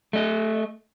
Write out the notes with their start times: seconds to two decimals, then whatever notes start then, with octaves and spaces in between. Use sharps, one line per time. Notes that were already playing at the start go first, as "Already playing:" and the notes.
0.13 A3 D#5